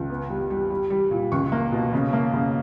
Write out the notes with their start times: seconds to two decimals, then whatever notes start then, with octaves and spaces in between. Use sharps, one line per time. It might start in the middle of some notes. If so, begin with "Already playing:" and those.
Already playing: C#2
0.10 B3
0.30 G3
0.50 G3
0.70 G3
0.90 G3
1.11 A#2
1.32 C#2 C#6
1.52 A#3
1.72 B2
1.93 C#3
2.13 A#3
2.33 C#3